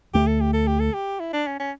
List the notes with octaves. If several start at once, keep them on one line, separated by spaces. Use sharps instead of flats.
D2 D3 A3 G4
A4
G4
A4
G4
A4
G4
E4
D4
C#4
C#4